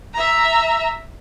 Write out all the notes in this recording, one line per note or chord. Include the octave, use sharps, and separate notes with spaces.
E5 A#5